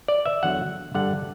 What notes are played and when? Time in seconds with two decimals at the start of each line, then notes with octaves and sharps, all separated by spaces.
0.08 D5
0.26 E5
0.43 E2 D3 F#3 F#5
0.94 G2 D3 G3 D4 F#5